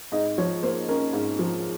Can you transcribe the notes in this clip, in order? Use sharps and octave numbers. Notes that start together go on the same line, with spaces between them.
G#2 D#5
F3 C#5
A#3 C5
C#4 A#4
G#2
F3